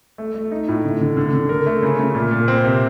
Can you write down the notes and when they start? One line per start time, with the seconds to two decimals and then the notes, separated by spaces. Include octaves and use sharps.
0.18 A3
0.35 A3
0.52 D#4
0.68 A2
0.85 D3
1.01 D3
1.17 D3
1.33 D3
1.49 A#4
1.66 A3
1.83 C#3
1.99 C#3
2.15 A#2
2.31 A#2
2.48 C4
2.64 C3